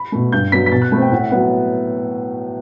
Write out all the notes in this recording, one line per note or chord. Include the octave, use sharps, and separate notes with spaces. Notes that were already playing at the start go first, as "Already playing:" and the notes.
Already playing: B5
B2 A3
G2 G6
F#3 B3 B6
B6
B2 A6
F#6
A3 C4 B5
G5
A2 F#5
F#3 B3 F#5